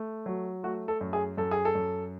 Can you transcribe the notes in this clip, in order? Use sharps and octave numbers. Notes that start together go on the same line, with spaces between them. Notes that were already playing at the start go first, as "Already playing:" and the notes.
Already playing: A3
F#3
A3 F#4
A4
F#2
G#4
F#2 A4
G#4
A4
F#2